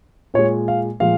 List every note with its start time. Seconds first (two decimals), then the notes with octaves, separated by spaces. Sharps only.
0.34 A#2 G#3 C#5
0.68 F5
1.00 A#2 F3 G#3 F5